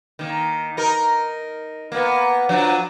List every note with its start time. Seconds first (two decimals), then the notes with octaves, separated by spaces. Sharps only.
0.19 D#3 A#3
0.77 D#4 A#4
1.92 A#3 B3
2.49 F3 F#3 D4